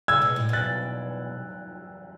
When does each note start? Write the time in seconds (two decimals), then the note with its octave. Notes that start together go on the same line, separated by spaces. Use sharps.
0.08 C#3 E6 G#6
0.22 B2
0.36 A2
0.49 B2 F#6 A6